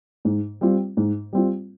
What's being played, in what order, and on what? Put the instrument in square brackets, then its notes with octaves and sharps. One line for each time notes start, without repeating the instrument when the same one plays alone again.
[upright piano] G#2
G3 C4 F4
G#2
G3 C4 F4